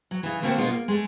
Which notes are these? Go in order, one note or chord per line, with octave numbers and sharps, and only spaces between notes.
F#3
C#3 E3
D3 A3 A#3 C4 F#4
B2 G#3 A#3 B3 D4 F4
A#3
G#3 A3